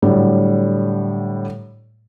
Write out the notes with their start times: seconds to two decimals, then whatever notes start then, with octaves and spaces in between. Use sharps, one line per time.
0.02 A2 D3 F#3 G3